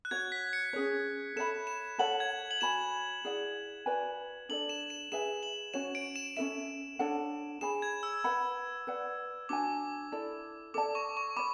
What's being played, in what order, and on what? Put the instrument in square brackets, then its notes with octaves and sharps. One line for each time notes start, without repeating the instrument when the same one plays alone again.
[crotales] F#6
[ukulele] F#4 C#5 F#5 [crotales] G#6
[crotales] B6
C#7
[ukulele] C#4 G#4 C#5
[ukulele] A4 C#5 E5 B5 [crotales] E7
[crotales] E7
[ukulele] A4 C#5 F#5 A5 [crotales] F#7
[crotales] G#6
F#7
[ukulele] F#4 C#5 G#5 B5 [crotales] E7
[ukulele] E4 G#4 D5 F#5
F#4 B4 D5 G#5
[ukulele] D4 A4 D5 [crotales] F#7
[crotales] E7
E7
[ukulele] G#4 B4 E5 G#5 [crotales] E7
[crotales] F#7
[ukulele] C#4 F#4 C#5 [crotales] E7
[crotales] D7
E7
[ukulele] C#4 F#4 A4 E5 [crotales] E7
[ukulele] D4 A4 C#5 F#5
[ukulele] G#4 C#5 G#5 B5 [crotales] E7
[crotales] G#6
E6
[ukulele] B4 F#5 B5
B4 D5 F#5
[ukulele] D4 F#4 C#5 G#5 [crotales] D6
[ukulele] E4 A4 D5
[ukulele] A4 D5 A5 [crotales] D6
[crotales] C#6
C#6
[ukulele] C#5 B5 [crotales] D6